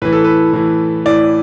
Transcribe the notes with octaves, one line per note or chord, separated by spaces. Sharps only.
A2 E3 B4
A4
B4
A2 E3
A2 E3 D5